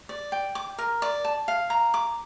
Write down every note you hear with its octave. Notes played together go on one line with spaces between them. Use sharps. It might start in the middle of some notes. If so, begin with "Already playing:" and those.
D5
G5
D6
A#4
D5
A5
F5
A#5
D6